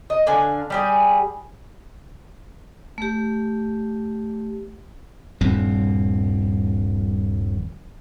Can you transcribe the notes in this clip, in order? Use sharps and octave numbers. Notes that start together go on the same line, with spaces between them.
D#5
D3 D4 F5 G#5
G3 G4 G#4
A3 G4
D#1 G2 F3 C4